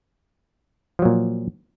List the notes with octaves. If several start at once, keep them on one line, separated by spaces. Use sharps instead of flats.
A#2 F3 F#3